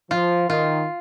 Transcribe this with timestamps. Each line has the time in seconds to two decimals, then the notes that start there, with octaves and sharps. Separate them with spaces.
0.11 F3 F4
0.49 D#3 F4